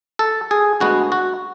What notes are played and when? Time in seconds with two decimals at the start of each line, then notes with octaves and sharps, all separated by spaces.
0.19 A4
0.51 G#4
0.80 D2 D3 G#3 B3 F#4
1.12 F#4